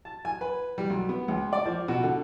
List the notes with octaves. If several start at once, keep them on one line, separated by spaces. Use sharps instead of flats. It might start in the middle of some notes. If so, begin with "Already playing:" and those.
A5
G#5
B4
G3
B1
B3
C#2
D5
F3
B2
D3